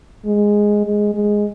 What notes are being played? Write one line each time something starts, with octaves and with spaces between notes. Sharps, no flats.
G#3
G#3
G#3